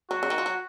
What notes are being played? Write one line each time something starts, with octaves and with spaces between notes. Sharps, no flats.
F#3 F#4
C#3
D#3
F3
F#3